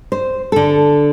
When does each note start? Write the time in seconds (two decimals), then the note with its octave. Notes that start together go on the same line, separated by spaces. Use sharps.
0.12 C5
0.52 D3 A4